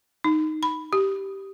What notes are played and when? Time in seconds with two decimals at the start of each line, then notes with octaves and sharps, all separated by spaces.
0.24 D#4
0.63 B5
0.93 G4